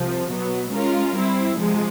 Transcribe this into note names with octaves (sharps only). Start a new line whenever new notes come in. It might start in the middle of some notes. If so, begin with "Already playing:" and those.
Already playing: C2 C3 F3
B2 F#3 B3
G#3 C#4 F4 A#4
G3 C4 E4
C3 F3 G#3